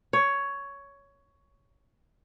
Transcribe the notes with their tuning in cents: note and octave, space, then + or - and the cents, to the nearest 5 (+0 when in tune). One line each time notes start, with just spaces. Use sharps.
C#5 +10